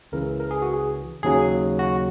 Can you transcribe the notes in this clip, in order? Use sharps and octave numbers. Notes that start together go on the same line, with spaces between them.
C#2 C#3 E3 A#4
A#4
G#4
F#4
G#4
D#2 C#3 F#3 G#4
F#4